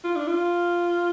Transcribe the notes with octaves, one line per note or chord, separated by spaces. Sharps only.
F4
D4
F4